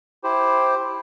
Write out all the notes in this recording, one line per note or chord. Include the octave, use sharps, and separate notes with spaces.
E4 G4 C5